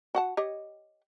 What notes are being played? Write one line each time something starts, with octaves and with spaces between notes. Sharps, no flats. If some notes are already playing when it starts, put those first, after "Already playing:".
F#4 F#5 A5
G4 C#5 D#5